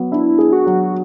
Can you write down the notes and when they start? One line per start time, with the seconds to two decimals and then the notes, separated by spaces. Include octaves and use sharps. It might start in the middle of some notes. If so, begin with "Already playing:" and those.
Already playing: F#3 B3
0.12 D4 E4
0.38 G#4
0.53 F#4
0.66 F#3